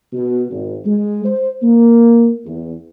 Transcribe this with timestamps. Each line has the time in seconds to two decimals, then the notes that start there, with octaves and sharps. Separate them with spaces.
0.13 B2
0.50 G#1
0.84 G#3
1.25 C5
1.62 A#3
2.45 E2